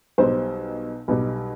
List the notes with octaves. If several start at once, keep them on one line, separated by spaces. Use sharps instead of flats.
B1 B2 G3 C5
B1 B2 G3